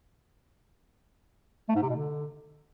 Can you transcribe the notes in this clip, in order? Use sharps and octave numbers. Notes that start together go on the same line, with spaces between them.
A3
G#2
C3
B2
D3